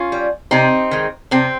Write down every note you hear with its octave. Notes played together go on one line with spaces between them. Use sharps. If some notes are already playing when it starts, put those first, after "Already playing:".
Already playing: C#4 F4
G3
C3 C4 D#4
D#3 G#3
C3 C4